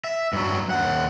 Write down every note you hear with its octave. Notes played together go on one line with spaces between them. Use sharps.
E5
G2 F#3
D#2 F#5